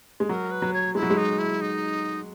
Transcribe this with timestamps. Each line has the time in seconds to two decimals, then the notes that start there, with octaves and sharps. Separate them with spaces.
0.20 G#3
0.29 F#3 A#4
0.51 B4
0.62 F#3
0.74 C#5
0.95 G#3 E4
1.03 F#3
1.10 G#3
1.18 D#4
1.39 E4
1.61 D#4